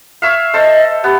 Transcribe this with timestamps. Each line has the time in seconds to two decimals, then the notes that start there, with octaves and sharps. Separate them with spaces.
0.22 C#5 E5 F5
0.54 A4 C5 D#5
1.04 B3 G4